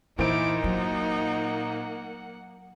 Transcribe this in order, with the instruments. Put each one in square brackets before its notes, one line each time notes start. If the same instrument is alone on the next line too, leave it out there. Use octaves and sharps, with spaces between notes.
[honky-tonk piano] A#2 C5 D7 [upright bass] E3 [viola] D#4 [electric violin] E4 D6
[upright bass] F#3 [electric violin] A#3 F#5